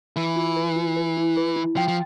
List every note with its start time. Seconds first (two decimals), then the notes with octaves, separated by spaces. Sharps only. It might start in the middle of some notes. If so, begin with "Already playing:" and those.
0.16 E3 B4
0.36 F4
0.56 B4
0.76 F4
0.96 B4
1.17 E4
1.37 B4
1.56 E4
1.76 F3 G5
1.88 F3